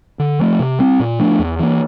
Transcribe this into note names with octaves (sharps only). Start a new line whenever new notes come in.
D3
F3 A3
C3
G3 C4
A#2
F3 A3 D4
E2
E3 A#3